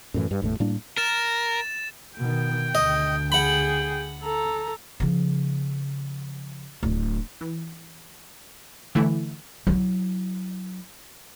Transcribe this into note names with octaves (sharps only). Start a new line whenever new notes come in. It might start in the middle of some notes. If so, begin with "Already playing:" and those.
F#2 A2 E3
G2
G1 E2 A2 A3
A2 G3 A#3 D4
A#4 A6 E7
B2 D#3 G5
D2 D#5
G#4 F#5 G5 B5
A4 A#5
C#3 F3
D1 D4
E3
D3 E3 A3 E4
F#3 E4